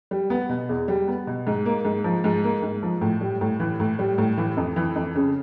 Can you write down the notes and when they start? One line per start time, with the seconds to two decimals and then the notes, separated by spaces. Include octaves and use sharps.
0.11 G3
0.30 B3
0.49 B2
0.69 E2
0.88 G3
1.08 B3
1.27 B2
1.47 G#2
1.65 A#3
1.85 G#2
2.04 F3
2.24 G#2
2.44 A#3
2.62 G#2
2.82 F3
3.01 A2
3.21 G3
3.41 A2
3.60 E3
3.80 A2
3.99 G3
4.18 A2
4.38 E3
4.57 F2
4.76 E3
4.96 F2
5.15 C#3